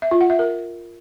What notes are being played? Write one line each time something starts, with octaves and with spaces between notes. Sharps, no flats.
E5
F4
F#5
E5
A#4